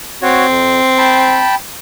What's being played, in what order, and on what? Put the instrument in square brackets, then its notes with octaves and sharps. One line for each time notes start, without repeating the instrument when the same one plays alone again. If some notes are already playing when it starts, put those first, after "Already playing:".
[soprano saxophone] C4 [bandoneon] F#4 C#5
[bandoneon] F2
G5 A5 B5